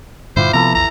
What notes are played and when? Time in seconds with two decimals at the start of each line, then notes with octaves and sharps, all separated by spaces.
0.36 G2 A#2 D3 E4 F4 G4 C5
0.53 C3 F3 B3 E4 A4 B4 A#5
0.75 A#1 E2 A#5